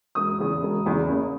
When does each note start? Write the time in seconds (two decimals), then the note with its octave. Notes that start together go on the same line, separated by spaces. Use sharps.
0.15 E1 D#6
0.39 E2 C#3
0.62 E1
0.86 E2 C#3
1.09 F#1